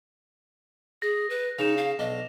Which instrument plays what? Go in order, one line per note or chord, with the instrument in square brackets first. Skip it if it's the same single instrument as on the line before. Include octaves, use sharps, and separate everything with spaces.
[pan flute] G#4 [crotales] A#6
[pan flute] B4
[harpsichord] C#3 [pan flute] D#4 [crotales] E7 F7
[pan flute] F5
[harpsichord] B1 D4 [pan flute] D#5